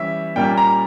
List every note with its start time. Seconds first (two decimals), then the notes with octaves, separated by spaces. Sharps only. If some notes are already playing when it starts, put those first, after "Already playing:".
Already playing: E3 G3 C#4 E5
0.36 A#2 G3 A#3 C#4 G5
0.57 A#5